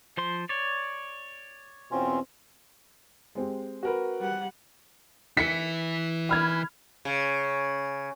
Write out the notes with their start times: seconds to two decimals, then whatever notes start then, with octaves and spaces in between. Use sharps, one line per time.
0.17 F3 C5 C6
0.49 C#5 D5
1.91 E2 B2 C4 C#4 F4
3.35 G#3 C4 G4
3.83 F#4 A#4 B4
4.21 G3 F#5
5.37 E3 E4 B6 C#7
6.29 B5 F6 G#6
7.05 C#3